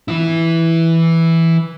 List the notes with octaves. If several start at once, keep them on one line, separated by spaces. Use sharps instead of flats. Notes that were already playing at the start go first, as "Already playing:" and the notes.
E3 E4